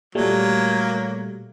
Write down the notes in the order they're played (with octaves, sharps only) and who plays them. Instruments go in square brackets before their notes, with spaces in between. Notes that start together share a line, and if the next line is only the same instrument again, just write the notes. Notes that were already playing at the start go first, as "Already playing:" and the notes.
[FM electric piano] A#2 G3 A3 [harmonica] F#3 A#3